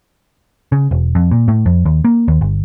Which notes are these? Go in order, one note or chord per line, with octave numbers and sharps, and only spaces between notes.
C#3
E1
F2
A#2
A2
F2
D#2
A#3
D#2
G1